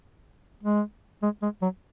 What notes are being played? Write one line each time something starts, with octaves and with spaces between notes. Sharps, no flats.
G#3
G#3
G#3
F#3